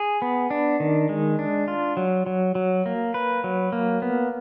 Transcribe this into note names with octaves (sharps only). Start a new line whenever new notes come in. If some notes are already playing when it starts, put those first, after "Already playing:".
Already playing: G#4
B3
D4
D#3
G#3
D4
F4
F#3
F#3
F#3
A#3
B4
F#3
A#3
B3